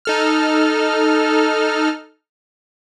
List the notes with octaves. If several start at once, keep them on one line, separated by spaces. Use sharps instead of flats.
D#4 A4 F6